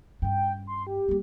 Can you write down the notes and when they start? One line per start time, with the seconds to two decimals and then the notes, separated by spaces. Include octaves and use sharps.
0.22 G2 C#4 G5
0.67 C6
0.87 G4
1.08 G3 A#3